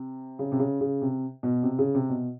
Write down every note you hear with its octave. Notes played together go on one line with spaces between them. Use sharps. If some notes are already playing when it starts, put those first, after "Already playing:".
Already playing: C3
C#3
C3
C#3
C#3
C3
B2
C3
C#3
C3
B2